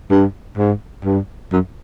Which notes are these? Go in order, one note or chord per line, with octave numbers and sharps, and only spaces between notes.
G2
G#2
G2
F#2